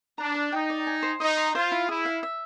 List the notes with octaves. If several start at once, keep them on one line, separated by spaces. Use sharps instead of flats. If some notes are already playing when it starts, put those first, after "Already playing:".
D4 A#5
D5
D#4 G5
D5
G#5
C5
D#4 D#5
C6
F4 C5
E4
E4 G#4
F5
E5